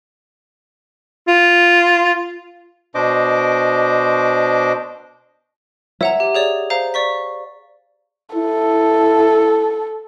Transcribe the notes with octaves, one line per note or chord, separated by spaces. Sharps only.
F4
B2 D4 C5 D#5 D6
C#5 E5 F#5 A#5
G4
G#4 C#5 D5
C5 F5 A#5
D5 C#6 B6
E4 A4